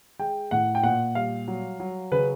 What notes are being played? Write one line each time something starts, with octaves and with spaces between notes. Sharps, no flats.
G#3 G5
A2 F#5
G5
A#2 F#5
G3 F5
F#3
F#3
C#3 B4